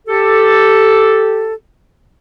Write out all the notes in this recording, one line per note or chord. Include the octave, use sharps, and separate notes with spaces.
G4 A4